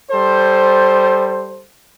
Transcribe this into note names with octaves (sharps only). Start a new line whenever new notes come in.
G3 A4 C5